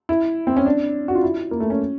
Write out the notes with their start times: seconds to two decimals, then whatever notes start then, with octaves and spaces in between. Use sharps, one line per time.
0.09 E4
0.47 C4
0.57 C#4
0.66 D4
1.08 F#4
1.15 F4
1.23 E4
1.51 A#3
1.60 A3
1.70 C#4